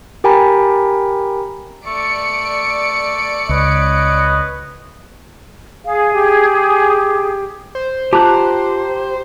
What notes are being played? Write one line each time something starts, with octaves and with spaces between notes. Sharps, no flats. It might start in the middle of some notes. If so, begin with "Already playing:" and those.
G4 A#4 G5 G#5 A#5 B5
A3 D5 C#7 D7
C#2 B4 C#5 D#5
G#4 F5
G4
C5
F4 G4 A5 A#5 F#6